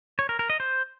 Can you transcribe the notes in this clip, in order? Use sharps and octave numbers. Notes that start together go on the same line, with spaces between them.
C#5
A#4
A#4
D#5
C5